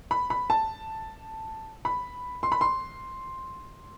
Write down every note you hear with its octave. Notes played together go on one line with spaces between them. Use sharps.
B5
B5
A5
B5
C6
B5
C6